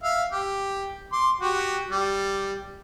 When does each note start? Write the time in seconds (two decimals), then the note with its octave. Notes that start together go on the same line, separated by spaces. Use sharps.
0.03 E5 F5
0.31 G4
1.12 C6 D6
1.40 F#4 G4
1.90 G3